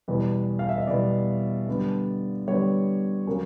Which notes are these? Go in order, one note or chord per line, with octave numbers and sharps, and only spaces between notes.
E2 B2 G3 B3
F5
E5
D#5
E2 B2 G3 B3 D5
D3 G3 B3
D3 G3 B3 C#5
C#3 F#3 A#3 C#4